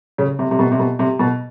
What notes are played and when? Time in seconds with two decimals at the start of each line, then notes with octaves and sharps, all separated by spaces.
0.18 C#3
0.39 C3
0.51 C3
0.59 B2
0.72 C3
0.79 B2
0.99 C3
1.19 B2